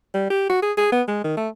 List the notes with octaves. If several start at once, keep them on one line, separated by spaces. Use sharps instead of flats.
G3
G4
F#4
G#4
G#4
B3
G#3
D#3
A3